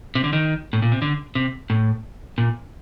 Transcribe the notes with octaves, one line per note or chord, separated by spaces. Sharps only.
C3
D3
D#3
A2
A#2
C3
D3
C3
A2
A#2